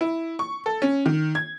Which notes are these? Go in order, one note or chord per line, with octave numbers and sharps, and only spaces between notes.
E4
C#6
A4
C#4
D#3
G#6